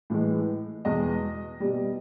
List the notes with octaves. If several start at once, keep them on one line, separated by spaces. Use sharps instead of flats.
A2 E3 G#3
E2 B2 G#3 D#5
B2 G3